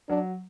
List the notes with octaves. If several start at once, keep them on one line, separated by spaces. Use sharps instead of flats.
F#3 D4